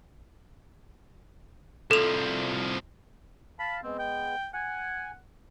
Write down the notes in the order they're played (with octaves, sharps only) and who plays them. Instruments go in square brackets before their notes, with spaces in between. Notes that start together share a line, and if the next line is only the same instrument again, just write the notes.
[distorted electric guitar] C2 F3 [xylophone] A4 F7
[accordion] F5 A5 [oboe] B5
[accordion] G#3 B3 [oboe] C4
[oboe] G5
[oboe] F#5 [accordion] G#5